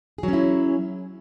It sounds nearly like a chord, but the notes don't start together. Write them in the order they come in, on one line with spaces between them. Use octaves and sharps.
G#4 F#3 C#4 E4